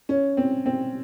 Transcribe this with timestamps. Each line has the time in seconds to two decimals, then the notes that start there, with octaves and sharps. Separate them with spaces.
0.09 C#4
0.37 C4
0.66 C4